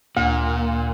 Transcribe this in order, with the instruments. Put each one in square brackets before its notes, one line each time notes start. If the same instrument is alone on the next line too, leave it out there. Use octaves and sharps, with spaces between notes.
[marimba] D2 [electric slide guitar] A#2